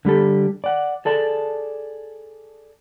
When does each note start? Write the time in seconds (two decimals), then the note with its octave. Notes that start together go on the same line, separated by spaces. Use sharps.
0.05 D3 G3 G4 A4
0.64 D5 F#5
1.05 G#4 A4 D5 A5